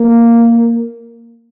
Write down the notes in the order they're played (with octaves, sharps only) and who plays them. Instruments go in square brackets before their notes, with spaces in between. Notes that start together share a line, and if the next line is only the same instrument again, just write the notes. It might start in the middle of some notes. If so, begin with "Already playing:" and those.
Already playing: [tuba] A#3